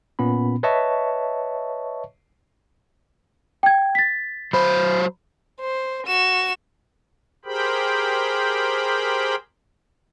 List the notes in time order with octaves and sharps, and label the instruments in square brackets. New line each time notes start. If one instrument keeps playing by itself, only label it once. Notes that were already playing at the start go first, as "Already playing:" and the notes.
[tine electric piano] A#2 B3 C#4 B5
B4 C#5 D#5 E5 A5 C#6
[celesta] G5 G#6
A6 B6
[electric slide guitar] F#3 C5 [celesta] B5
[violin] C5
F#4 E7
[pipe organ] G4 G#4 A#4 C5 G5 B5